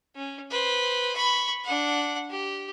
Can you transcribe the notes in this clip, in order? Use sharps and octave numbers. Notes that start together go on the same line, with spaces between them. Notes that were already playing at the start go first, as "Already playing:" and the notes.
C#4
B4 C5
B5 C#6
D4 F#5
G4